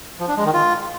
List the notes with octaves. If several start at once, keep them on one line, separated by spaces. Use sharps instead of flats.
F3
D4
G#3
D#3
F4